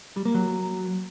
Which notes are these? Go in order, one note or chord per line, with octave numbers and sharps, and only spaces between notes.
G3
A#3
F#3